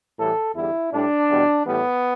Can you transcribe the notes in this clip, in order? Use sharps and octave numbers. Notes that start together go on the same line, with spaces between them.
A2 E3 G3 A4
E2 D3 G3 E4
A2 G3 D4
E2 B2 G3
A2 E3 G3 B3